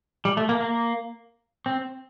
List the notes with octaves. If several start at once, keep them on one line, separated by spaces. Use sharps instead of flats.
G3
A3
A#3
A#3
C4